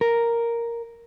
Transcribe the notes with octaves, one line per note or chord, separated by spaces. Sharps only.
A#4